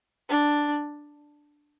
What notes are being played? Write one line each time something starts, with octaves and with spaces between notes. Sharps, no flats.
D4